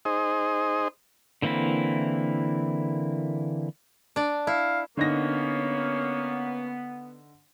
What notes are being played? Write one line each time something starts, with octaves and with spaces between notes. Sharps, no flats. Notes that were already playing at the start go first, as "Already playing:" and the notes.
D#4 G#4 C5 D#5
D3 E3 A#3 C4 E4
D4 D5
E4 F5
D3 A#3 B3 C#4 D#4 A#6